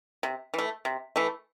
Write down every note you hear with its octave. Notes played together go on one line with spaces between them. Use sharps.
C3
E3 A3
C3
E3 A3